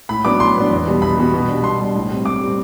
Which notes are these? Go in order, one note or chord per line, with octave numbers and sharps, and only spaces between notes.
A2 B5
F#3 B3 D4 D6
A2 C6
F#3 B3 D4
E2
B2 G3 B3
E2 B5
B2 G3 B3
B2
G3 D4
B2 C6
G3 D4
A2
G3 C4
A2 D6
G3 C4